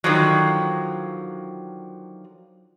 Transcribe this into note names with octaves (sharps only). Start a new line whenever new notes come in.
D3 D#3 F3 F#3